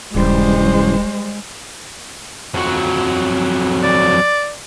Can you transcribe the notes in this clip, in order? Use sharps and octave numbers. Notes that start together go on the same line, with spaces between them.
D#1 G2 C#3 E3 G3 G#3 C5
F2 F#3
D5